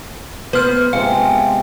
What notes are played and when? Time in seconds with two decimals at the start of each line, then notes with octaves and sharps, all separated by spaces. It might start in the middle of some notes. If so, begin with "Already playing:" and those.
0.53 B3 B4 C5 F6
0.93 C3 G#3 B3 C4 F5